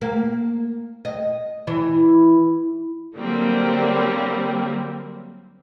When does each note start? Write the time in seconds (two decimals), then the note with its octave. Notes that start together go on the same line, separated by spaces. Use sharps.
0.01 A#3
1.05 D#5
1.67 E3
3.15 D3 F#3 G3 A#3 C4